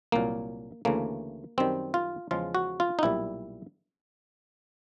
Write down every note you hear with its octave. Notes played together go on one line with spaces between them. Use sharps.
C2 A#2 F#3 A#3
D2 C#3 E3 A3 A#3
F#2 D#3 G3 C4
F4
E2 C#3 F3 G#3 F4
F#4
F4
D#4
B1 A#2 G3 E4